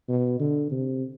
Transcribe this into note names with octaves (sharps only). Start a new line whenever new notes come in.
B2
D3
C3